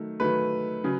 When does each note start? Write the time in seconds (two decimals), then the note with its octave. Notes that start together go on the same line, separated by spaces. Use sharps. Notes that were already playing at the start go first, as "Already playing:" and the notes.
Already playing: D#3 F#3 A3
0.20 D#3 F#3 A3 B4
0.84 C#3 F#3